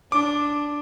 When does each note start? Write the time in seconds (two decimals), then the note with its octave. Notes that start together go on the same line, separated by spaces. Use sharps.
0.12 D4 D6